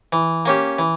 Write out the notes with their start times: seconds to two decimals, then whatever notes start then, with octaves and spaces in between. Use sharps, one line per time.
0.13 E3
0.46 A#3 C#4 G4
0.79 E3